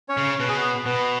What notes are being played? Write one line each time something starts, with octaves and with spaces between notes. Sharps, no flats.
C#4 C#5
C#3
B2 B4
G#4
B3 B4
B2 B3 B4